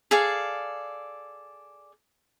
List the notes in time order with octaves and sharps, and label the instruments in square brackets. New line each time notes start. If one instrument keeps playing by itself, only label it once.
[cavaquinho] G#4 A4 D5 F5